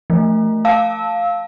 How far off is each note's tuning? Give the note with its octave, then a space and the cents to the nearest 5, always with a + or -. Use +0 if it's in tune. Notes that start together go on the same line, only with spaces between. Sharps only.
F3 -35 A3 +0
F5 +0 A5 +0 E6 -20